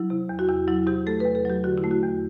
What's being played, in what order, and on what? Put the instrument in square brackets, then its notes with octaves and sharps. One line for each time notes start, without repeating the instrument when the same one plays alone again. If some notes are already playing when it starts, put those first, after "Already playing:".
Already playing: [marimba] F#3 E4
C3
E2
F#4
E2 E4
F#3 E4
C3 G4
A3 A4
B4
E2
A4
F#3 G4
D3 F#4
E4
A3
F#4
E2